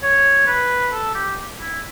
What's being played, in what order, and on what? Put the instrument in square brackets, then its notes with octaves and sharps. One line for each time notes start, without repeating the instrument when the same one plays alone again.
[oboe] C#5
B4
A4
G4
E4